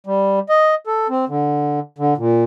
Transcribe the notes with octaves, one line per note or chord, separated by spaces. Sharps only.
G3
D#5
A4
C4
D3
D3
A#2